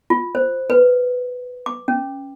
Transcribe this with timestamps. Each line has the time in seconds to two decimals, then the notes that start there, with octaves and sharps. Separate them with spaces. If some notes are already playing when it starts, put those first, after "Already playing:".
0.10 F4
0.35 C5
0.70 B4
1.66 D6
1.88 C#4